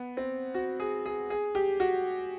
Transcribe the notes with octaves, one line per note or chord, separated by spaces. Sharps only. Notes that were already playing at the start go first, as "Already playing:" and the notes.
Already playing: B3
C4
F#4
G#4
G#4
G#4
G4
F#4